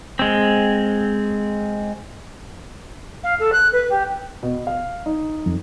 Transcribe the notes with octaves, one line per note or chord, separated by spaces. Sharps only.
G#3 C4
F5
A4
F#6
B4
G4
B2
F5
D#4
F2